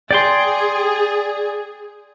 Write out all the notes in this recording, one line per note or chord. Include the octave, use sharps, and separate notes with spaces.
G#4 D5 G5 C6